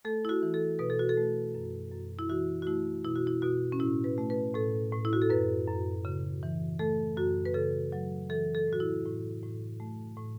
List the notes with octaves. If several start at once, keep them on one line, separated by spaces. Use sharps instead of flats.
A3 A4
E4
F#4
E3
A4
B2 B4
A4
F#4
A4
A3
F#2
F#2
E4
E3 F#4
F#4
A3 E4
B2 E4
F#4
E4
B2 F#4
C#4
A2 E4
B4
A3
B4
A2 A4
A2
E4
F#4
A4
F#2 B4
F#2
C#3
E3
A3 A4
F#2 F#4
B4
C#3 A4
F#3
E3 A4
A4
A2
F#4
E4
A2
A2
A3
A2